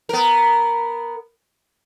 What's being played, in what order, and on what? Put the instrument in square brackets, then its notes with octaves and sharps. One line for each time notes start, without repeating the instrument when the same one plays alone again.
[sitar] B3 A#4